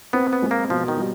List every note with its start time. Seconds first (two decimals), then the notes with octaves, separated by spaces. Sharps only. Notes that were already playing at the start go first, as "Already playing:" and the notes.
0.13 B3 C4
0.33 B3
0.42 G#3
0.51 A#3
0.69 B2 F3
0.88 D#3
0.97 G3